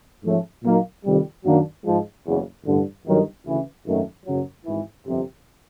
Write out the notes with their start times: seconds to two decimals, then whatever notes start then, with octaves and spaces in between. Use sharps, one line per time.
0.23 G#2 F3 A3 C#4
0.63 A#2 F#3 A#3 D#4
1.04 F2 C3 D#3 G3
1.44 F#2 D#3 F#3 A#3 D4
1.84 G#2 F3 G#3
2.24 F#1 E2 C#3
2.65 A1 G2 D3
3.05 G1 G2 D#3 F#3
3.45 D2 C#3 E3
3.85 G#1 F#2 D#3 F#3 A3
4.26 F#1 F#2 C#3 F#3
4.66 G#1 G#2 E3
5.06 G1 F2 C3